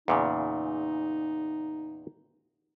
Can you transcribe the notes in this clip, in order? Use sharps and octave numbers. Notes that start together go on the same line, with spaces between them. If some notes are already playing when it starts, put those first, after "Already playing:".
E2 A#2 C#3 D#4